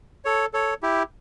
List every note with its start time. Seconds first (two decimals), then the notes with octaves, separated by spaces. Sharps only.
0.25 A4 C#5
0.54 A4 C#5
0.83 E4 G4